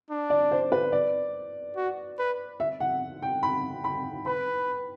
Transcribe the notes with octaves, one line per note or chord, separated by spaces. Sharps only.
D4
D5
C5
B4
D5
F#4
B4
E5
F#5
G5
B5
B5
B4 B5